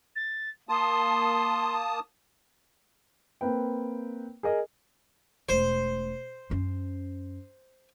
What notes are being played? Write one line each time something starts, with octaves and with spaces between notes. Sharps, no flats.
A6
A#3 A5 C6 D#6
A#3 C4 B4 G5
G#4 A#4 D#5
E1 A3 C5
F#2 C#4